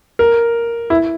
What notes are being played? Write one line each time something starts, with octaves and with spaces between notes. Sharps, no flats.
A#4
E4